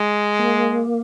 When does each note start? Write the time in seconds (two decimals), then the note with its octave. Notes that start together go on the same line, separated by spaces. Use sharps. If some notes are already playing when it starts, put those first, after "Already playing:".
Already playing: G#3
0.39 A#3